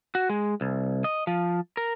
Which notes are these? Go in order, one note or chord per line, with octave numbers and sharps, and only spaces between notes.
F#4
G#3
C2
D#5
F3
A#4